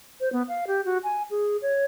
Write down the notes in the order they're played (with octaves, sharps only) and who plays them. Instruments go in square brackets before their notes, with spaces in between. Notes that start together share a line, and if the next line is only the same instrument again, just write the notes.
[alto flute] C5
B3
F5
G4
F#4
G#5
G#4
C#5